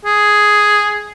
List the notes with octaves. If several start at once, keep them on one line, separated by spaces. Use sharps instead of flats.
G#4